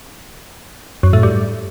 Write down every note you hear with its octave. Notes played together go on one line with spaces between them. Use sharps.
F#2
A2
G2